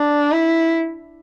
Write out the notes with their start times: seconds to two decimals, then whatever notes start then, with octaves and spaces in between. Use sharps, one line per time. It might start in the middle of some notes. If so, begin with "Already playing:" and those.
Already playing: D4
0.32 E4